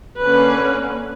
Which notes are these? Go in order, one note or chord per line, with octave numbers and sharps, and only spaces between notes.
D3 A#3 C#4 B4